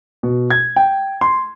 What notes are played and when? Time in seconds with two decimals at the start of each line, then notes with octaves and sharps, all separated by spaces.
0.23 B2
0.50 G#6
0.76 G5
1.21 C6